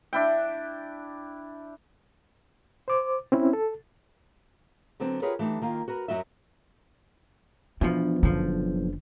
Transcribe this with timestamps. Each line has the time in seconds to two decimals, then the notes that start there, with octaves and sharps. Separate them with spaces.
0.13 D4 E4 G5
2.88 C5 D6
3.32 C4 C#4 E4
3.53 A4
5.00 D3 F#3 B3 C4
5.22 F4 G4 G#4 A#4 B4 C#5
5.39 E3 A3 D4 D#4 G4
5.62 D#3 A#3 F4
5.88 F#4 A#4 B4
6.08 F#2 B2 F#3 F#4 D#5 E5
7.81 E2 B2 F3 D4
8.23 F#1 B1 D3 F3